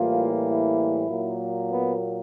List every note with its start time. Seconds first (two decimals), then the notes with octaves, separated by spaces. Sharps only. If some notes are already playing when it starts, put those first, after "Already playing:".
Already playing: A2 E3 G3 A#3 F4
0.47 E4
1.09 A#2 F#3 A#3
1.72 B3